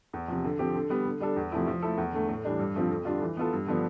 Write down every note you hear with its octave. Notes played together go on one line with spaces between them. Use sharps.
E2
C3 F3
D3
F3 C4 G4
D3
G3 B3
D3
G3 D4 A4
E2
C3 F3 A3 E4
F3
A3 E4 A4
E2
D3 A3
A2
E3 G3 D4
G2
D3 F3 C4 F4
F2
D3 G3 D4 F4
E3
B3 F4 A4
G2
D3 F3 B3 D4